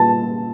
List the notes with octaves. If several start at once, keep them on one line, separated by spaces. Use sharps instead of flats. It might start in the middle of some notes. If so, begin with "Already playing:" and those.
Already playing: A#2 G3 A#3 A5